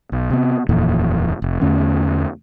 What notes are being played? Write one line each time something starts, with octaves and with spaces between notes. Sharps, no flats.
B1
C3 B3
D#1 F2 A#2 E3
F1
E2 D3 A3 C#4